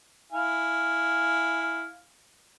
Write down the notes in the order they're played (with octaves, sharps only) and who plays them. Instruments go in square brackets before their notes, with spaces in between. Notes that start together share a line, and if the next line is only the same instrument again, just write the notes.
[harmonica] E4 F5 G#5